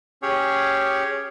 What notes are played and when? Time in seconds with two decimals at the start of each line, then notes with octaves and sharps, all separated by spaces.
0.22 C#4 G4 G#4 C#5